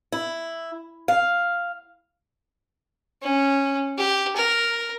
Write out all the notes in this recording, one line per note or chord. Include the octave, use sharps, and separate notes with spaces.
E4
F5
C#4
G4
A#4